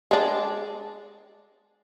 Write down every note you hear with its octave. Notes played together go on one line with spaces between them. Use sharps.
G#3 D4